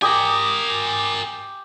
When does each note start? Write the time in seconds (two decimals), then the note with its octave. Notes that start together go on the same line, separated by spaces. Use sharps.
0.02 G4 A#4 G#5 D6 D#6